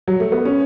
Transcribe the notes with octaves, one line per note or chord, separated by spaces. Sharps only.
F#3
A3
B3
C#4